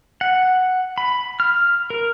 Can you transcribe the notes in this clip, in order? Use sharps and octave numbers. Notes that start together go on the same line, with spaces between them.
F#5
B5
F6
A#4